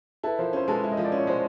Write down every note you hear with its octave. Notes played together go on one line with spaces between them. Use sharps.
E4 A4 B4
F3 A#4 C5
C#4 C5
G#3 A4 B4
E4
D#5
F3
D5
C#4
C#5
G#3 C5